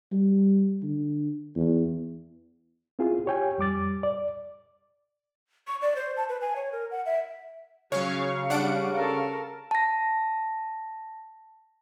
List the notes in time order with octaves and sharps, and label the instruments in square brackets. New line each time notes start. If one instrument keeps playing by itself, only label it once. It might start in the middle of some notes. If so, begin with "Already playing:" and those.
[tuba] G3
D3
E2
[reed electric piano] C4 E4 F4 G#4
G4 C#5 G5 G#5
F2 G3 D6 A6
D5
[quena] C#6
D5
C5
A5
B4
G#5
C#5
A#4
F#5
E5
[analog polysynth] C#3 F5 C#6 [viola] F#3 [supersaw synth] C#5
[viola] G3 [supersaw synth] D4 F#5 D7
[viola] A4 A#4
[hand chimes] A5 A#6